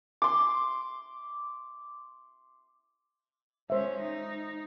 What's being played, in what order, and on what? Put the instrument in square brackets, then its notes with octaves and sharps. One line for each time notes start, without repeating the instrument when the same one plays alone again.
[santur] C6 D6
[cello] G#3 C#4 [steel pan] C5 E5
[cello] D#4